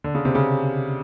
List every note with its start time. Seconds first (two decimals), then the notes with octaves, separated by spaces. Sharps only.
0.04 D3
0.15 C#3
0.25 C3
0.35 C#3